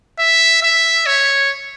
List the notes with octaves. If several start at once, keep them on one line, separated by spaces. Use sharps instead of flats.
E5
E5
C#5